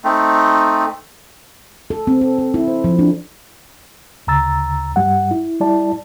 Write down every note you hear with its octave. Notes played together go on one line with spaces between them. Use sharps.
A3 C4 D#4
A4
C4
A4
A4
E4
C5
F3
D4
D2 C#3 A#5 E6 A6
G2 G3 F#5
E4
G3 E4 D5 A5